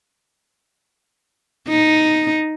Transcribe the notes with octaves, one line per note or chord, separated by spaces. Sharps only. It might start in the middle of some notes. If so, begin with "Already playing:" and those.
D#4